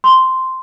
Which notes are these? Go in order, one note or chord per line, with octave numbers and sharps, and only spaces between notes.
C6